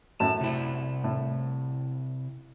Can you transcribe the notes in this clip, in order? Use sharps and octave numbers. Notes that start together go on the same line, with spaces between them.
F#2 A2 A5
C3 E4
A2